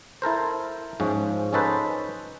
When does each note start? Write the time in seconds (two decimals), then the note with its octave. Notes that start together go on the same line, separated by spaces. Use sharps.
0.22 E4 A4 A#4 C5
1.00 G#2 F3 C#4
1.53 C#4 D#4 A4 B4 C5